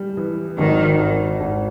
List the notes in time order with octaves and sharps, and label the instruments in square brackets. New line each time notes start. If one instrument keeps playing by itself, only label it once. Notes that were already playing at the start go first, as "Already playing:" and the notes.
Already playing: [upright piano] G3
E3
[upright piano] G#1 [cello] D#3
[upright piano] G#1
G#1